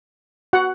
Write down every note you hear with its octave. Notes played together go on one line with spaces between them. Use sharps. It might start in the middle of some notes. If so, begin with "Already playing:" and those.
F#4 F#5